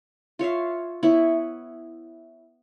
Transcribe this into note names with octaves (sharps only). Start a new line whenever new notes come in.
F4 C#5 E5 F5
B3 E4 C#5